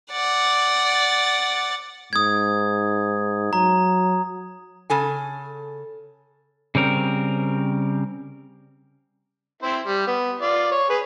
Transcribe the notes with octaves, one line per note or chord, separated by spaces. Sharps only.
D5 F#5
G#2 D#6 G#6
F#3 A#5
C#3 A4 G#5
C#3 G3 C4 A#4
C4 E4 C5
G3
B3
F4 D5
C#5
G#4 B4